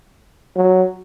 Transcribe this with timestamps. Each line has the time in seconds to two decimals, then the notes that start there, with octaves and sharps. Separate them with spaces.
0.56 F#3